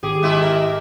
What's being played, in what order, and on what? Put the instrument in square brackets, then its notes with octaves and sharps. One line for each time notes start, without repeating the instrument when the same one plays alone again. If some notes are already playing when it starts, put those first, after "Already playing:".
[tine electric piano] G#1 G4 D6 [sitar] G#4
[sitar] A#2 G#3 E4
A#4